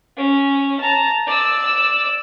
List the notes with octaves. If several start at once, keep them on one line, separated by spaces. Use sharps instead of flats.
C#4
A5 A#5
D5 E6